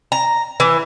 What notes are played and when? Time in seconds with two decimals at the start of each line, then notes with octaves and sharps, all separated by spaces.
0.12 A#5
0.60 E3